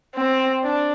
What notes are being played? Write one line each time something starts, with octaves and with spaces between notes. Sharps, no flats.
C4
D4